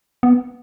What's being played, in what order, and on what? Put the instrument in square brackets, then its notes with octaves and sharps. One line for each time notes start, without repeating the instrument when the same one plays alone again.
[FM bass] B3